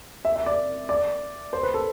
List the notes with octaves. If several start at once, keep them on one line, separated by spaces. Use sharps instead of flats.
E5
E5
D5
D5
C5
B4
A4